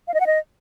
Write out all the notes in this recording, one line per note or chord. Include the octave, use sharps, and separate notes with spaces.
F5
D#5
F#5
D#5